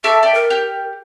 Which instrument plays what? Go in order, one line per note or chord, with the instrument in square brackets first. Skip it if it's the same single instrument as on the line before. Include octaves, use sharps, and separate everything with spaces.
[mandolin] A4 C#6 D6 [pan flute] E5
[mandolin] D5 G5
[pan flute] A#4
[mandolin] G4